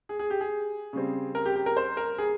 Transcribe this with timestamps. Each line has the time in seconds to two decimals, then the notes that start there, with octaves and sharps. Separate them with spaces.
0.09 G#4
0.19 G#4
0.30 G4
0.41 G#4
0.93 C#3 G3 C4
1.35 A#4
1.45 G4
1.56 G4
1.66 A#4
1.77 C5
1.97 A#4
2.18 G#4